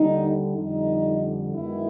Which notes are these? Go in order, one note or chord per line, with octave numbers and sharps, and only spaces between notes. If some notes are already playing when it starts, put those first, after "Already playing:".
Already playing: D#2 D3 G3 D#4
F2 D3 G3 D#4
F#2 D#3 G#3 B3 E4